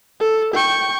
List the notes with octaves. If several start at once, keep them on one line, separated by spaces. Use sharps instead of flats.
A4
G5 C#6